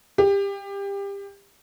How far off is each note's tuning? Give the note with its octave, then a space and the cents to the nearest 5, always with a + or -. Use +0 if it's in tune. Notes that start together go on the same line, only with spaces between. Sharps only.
G4 +25